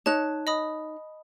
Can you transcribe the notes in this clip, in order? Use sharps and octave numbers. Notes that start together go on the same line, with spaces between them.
D#4 C#5 A5 F#6
D#5 B5 D#6